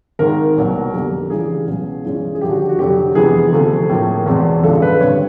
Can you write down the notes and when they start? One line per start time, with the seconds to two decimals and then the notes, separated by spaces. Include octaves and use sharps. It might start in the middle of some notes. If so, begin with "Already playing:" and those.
0.19 G#1 G#2 D#3 G#3 A#4
0.57 C2 B2 F#3 A#3
0.93 F2 D3 G3 A#3
1.30 C#2 C#3 E3 G3 G#4
1.67 C#2 B2 F#3
2.04 G2 E3 G#3 C#4
2.35 G#4
2.41 D#2 D3 F3 G4
2.51 F#4
2.60 G4
2.69 F#4
2.79 F1 F2 D3 F#3 G4
3.15 F2 C3 E3 G#3 B3 G#4
3.52 D2 C3 F3 A3
3.89 A2 F3 A#3
4.26 E2 B2 G#3 C4
4.64 A1 G2 D3 F3 G#3 A4
4.82 B4
5.00 D#2 D3 G3 C4 C#5